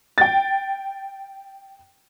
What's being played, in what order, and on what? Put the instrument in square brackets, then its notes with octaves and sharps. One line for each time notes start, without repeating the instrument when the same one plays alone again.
[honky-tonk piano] G5 A6